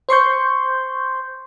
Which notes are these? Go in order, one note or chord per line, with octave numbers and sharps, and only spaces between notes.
C5 C6 C#6 G6